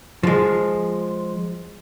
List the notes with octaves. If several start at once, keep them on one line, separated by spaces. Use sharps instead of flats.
F3 G#3